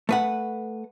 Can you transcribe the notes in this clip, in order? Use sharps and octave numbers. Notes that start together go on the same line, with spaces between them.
A3 B4 F#5